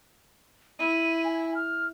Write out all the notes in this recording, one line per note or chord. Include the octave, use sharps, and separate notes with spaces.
E4 D#7
G#5
F6